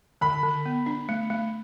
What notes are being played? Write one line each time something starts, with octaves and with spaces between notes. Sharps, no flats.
D3 B5
D3
B3
D4
A3
A3